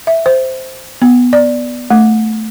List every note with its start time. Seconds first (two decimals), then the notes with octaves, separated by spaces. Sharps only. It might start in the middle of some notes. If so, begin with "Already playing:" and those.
0.07 E5
0.26 C5
1.02 B3
1.33 D5
1.91 A3